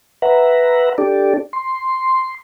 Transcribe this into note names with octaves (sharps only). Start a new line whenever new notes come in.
B4 E5 F#5 A#5
D4 G4 A4 D5
C6